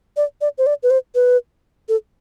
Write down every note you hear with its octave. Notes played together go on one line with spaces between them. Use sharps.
D5
D5
C5
D5
B4
C5
B4
A4